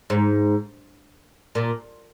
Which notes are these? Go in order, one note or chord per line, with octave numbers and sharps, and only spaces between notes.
G#2
A#2